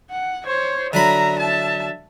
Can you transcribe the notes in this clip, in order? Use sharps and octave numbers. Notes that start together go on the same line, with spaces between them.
F#5
C5 C#5
D3 F#3 E5 A#5 B5
E5 A5